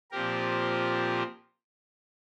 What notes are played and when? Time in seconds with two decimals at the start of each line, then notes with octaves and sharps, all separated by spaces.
0.11 A#2 F3 C4 G4 A#4